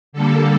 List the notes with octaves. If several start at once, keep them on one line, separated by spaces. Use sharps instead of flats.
D3 G3 A#3 A4